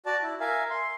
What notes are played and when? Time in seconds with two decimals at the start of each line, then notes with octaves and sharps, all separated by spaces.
0.06 F#4 D5 A5
0.23 E4
0.40 A#4 E5 F5 G#5
0.70 C6